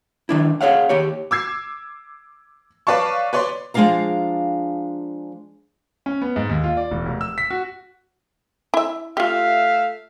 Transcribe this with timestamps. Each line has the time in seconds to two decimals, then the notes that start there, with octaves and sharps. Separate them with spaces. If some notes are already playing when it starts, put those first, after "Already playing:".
0.29 D#3 D4 E4
0.61 G#4 A4 C#5 F5 F#5
0.89 D#2 G4 C#5
1.31 D6 E6 G#6 C7
2.87 B4 C#5 D5 F5 A5 C#6
3.33 B4 C#5 D5 C6
3.74 F3 G#3 C4 D4 F5 A#5
6.06 C#4
6.21 B3
6.36 G#2
6.49 D#2
6.64 F4
6.77 D5
6.91 E1
7.05 F1
7.21 E6
7.38 B6
7.50 F#4
8.74 E4 E5
9.17 A3 F4 G4 E5 F5